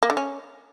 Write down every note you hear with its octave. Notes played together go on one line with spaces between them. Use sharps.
A#3
D3
C#4